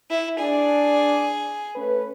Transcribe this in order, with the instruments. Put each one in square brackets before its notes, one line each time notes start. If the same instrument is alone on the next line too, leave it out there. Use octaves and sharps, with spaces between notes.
[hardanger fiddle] E4
[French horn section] D4 D5 [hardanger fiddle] G#4
[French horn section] A3 C#4 B4